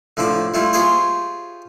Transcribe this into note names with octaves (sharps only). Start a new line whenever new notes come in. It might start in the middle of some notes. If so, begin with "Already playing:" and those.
A2 D3 F3 D4 D6
G3 A3 E4 F4
F4 G4 G#4 C5 C#5 E5